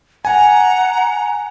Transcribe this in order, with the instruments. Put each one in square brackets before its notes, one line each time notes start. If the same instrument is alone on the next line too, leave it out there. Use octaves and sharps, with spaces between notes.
[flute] F#5 [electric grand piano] G#5 [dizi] A#5